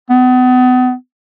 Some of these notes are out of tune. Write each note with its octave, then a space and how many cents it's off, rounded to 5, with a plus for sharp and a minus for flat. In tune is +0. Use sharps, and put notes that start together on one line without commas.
B3 +35